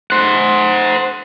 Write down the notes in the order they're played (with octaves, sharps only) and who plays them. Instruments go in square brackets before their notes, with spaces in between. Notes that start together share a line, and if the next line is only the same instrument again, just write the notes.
[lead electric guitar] C5 F#5